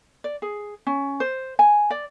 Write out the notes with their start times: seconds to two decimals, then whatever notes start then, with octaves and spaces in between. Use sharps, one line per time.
0.24 D5
0.42 G#4
0.87 C#4
1.20 C5
1.59 G#5
1.91 D5